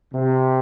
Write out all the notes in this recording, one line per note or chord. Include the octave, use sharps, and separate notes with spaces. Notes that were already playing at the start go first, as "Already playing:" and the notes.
C3